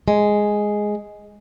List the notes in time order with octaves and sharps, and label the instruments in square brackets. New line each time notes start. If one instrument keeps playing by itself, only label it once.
[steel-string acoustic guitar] G#3